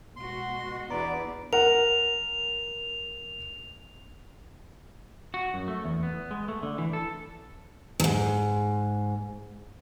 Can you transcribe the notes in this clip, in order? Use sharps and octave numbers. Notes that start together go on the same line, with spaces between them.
B2 G#3 F#4 C6
E2 B3 D4 E4 D5 A#5 D6
A#4 F#5 F7
F#4
F#2
A3
E2
B3
G#3
A3
D3
E3
A4
E2 G#2